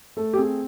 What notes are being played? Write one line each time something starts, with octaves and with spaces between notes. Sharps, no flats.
A3 A4
G4
C4 G#4